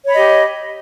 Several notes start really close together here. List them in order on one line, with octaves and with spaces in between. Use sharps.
C#5 B5 D#5 G4